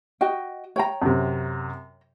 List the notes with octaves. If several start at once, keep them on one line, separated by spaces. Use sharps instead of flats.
F#4 D#5 G5
C#5 G5 A#5
F#2 C3